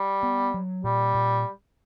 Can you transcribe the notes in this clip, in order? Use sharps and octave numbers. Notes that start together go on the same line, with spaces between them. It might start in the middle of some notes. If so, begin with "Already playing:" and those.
Already playing: G3
B3
F#3
A#2 G3
A#2